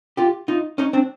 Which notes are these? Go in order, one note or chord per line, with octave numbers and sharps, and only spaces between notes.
F4 G4
D#4 F4
C#4 D#4
C4 D4